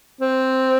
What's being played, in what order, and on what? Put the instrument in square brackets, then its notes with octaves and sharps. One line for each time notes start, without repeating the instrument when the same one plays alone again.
[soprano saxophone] C4